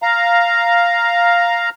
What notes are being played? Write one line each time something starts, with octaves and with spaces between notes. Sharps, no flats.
F5 A#5